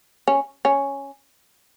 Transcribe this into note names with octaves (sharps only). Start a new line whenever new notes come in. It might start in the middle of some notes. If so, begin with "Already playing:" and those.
C#4
C#4